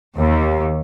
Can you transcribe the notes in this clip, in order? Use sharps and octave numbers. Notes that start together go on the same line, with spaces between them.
D#2